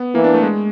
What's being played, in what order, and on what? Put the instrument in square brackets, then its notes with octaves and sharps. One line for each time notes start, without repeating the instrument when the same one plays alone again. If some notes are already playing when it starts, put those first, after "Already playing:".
Already playing: [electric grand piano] B3
[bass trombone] E3 [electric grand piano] A#3
[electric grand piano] D4
A3
G#3